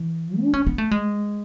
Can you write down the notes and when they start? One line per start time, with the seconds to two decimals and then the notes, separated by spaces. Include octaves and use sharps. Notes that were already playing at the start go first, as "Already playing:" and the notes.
Already playing: E3
0.42 D4
0.54 C#4
0.67 B3
0.78 A3
0.91 G#3